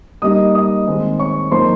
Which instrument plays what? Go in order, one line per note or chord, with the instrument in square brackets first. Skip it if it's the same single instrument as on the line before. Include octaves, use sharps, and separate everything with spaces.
[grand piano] G3 A#3 D#4 D#5 D#6
D#5 D#6
D#3 G#3 C4
C#5 C#6
F3 A#3 D#4 C5 C6